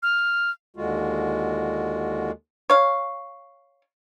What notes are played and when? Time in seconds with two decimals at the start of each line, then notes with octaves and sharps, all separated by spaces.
0.03 F6
0.76 D#2 D3 G#3 F4 F#4
2.70 C#5 F5